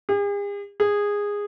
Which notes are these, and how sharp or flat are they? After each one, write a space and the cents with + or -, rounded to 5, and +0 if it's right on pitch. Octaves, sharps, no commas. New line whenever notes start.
G#4 -45
G#4 -15